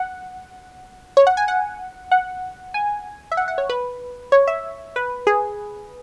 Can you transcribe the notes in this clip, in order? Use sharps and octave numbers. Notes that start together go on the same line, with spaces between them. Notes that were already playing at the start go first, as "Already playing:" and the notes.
Already playing: F#5
C#5
F#5
G#5
F#5
F#5
G#5
E5
F#5
F#5
C#5
B4
C#5
E5
B4
G#4